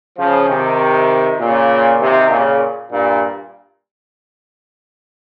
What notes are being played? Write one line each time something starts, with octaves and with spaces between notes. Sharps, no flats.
C#3 F3
C3 D#3
A#2 C#3
C3 D#3
A#2 C#3
G2 A#2